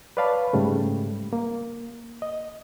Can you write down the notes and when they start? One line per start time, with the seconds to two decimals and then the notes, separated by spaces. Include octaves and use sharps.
0.17 B4 C#5 D5 F5 A5 B5
0.53 G#2 C#3 G3 A3
1.33 A#3
2.22 D#5